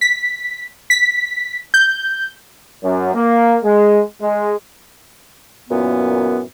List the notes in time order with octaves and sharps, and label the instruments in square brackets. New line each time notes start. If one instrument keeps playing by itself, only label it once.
[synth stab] B6
B6
G6
[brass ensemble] F#2
A#3
G#3
G#3
[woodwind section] F#2 A#2 E3 B3